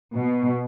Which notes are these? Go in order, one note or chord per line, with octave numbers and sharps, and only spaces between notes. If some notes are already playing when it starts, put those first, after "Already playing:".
B2